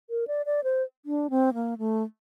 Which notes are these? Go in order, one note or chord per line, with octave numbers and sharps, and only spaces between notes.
A#4
D5
D5
C5
D4
C4
A#3
A3